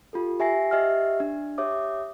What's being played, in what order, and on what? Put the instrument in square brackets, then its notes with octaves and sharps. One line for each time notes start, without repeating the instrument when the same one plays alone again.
[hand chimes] F4 G4 A4
G4 E5 G#5 A#6 C7
G4 D#5 E5 F#5 F6
D4
G4 C#5 E5 D6 D#6